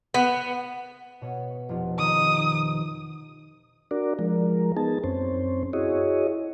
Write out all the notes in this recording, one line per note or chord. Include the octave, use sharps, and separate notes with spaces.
B3
B2 C#5
F1 F4
D#3 D#6
D4 F#4 A#4 D5
F3 G#3 A#4
B3 D#4 G#4 A5
F#2 C4 C#4 C5
E4 F#4 G#4 C#5 D#5